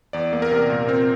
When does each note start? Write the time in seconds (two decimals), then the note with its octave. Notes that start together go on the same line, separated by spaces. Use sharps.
0.13 E2 D5
0.33 A#3
0.42 A#4
0.51 C3
0.70 A#2
0.89 C4